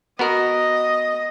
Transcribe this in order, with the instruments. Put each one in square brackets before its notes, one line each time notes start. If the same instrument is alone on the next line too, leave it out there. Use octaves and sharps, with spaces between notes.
[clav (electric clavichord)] B3 F#4 A#4 [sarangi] D#5